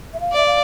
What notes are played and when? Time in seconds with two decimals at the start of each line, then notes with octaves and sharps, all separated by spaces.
0.14 E5
0.20 F5
0.33 D5 E5
0.47 F5